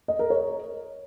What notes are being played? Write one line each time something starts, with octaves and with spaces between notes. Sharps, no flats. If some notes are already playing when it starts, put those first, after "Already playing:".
D#5
A#4
C#5